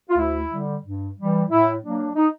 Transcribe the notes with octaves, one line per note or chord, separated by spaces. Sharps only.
F4
D2 E4
D3 G3
G2
E3 G3
A2 E4
F#3 A#3 D4
D#4